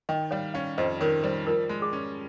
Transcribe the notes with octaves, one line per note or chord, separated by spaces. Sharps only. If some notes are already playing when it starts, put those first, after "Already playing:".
D#3 D#5 G5
G3 C#5 F5
C#4 C#5 F5
F2 C5 D#5
D#3 A#4 C#5
G3 C5
F3 A#4
G#3
G#4
C#4